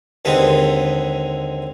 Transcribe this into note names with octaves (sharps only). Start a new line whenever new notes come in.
D#2 D3 G#3 C4 B4